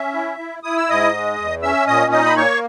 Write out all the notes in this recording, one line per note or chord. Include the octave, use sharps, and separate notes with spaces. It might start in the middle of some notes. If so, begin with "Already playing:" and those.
Already playing: C#4 E5
E4
E4
E4 D#6
E6
G#2 D#5 D#6
G#3
E2
C#4 E5 E6
A#2 D#5 D#6
D#4 D#5 D#6
B5
A#3 C#5 C#6